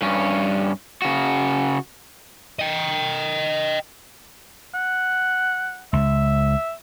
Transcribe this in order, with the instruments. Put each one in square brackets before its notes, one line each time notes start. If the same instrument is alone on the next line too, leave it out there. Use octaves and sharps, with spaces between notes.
[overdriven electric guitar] G2 C#4
C#3 F#4
[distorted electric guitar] D#5 G5
[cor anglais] F#5
[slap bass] C#2 [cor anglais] E5